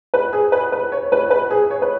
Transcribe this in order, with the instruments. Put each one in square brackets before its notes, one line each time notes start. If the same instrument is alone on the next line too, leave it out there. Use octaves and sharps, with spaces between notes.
[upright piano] B4
G#4
B4
B4
C#5
B4
B4
G#4
C#5
B4